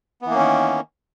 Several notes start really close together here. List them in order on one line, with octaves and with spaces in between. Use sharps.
B3 E3 A#3 C#4 D#3